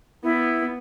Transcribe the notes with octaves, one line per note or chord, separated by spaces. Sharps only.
B3 E4